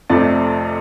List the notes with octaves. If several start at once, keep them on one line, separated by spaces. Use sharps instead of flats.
F2 C3 F3 A3 C4 D5